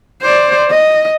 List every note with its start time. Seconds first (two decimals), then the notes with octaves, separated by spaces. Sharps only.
0.22 C5 D5
0.71 D#5